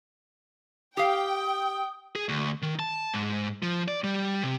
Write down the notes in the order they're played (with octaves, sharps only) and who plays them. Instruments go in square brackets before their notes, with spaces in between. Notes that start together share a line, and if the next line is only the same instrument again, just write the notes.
[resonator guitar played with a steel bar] G4 F5 [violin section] G5 [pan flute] D#6
[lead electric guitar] G#4
D2
D#3
A5
G#2
F3
D5
G3
C3